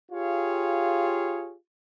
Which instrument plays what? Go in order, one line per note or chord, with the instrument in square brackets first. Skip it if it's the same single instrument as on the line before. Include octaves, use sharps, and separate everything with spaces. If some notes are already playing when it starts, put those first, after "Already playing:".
[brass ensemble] F4 G4 G#4 C#5 F5